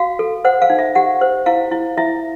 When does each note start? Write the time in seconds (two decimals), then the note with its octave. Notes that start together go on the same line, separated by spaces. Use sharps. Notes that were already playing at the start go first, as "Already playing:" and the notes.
Already playing: F#4 F5
0.19 A4
0.45 C5 F#5
0.62 F5
0.70 D#4
0.79 E5
0.95 G4 F#5
1.21 C5
1.46 E4 F5
1.71 E4
1.97 E4 E5